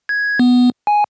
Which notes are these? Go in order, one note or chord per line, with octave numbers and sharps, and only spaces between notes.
G#6
B3
G#5